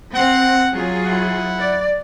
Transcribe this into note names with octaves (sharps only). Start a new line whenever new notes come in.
C4 F#5
F#3 F4 G#4
E4 F#5
D5